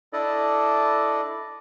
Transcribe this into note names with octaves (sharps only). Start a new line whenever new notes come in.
D4 E4 A4 D5 D#5